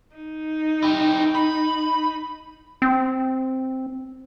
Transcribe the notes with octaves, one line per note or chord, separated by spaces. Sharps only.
D#4
E4 G4
B5
C4